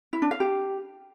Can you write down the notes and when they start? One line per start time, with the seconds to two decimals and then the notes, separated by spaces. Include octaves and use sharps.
0.13 E4
0.22 D4
0.31 F5
0.40 G4